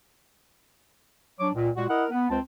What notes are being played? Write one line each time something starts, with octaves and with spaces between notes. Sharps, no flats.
F#3 D4 C#5 D6
C#2 A#2
A#2 G#3 F#4
E4 A#4 D#5 F#5
B3
C#2 C4 C5 A5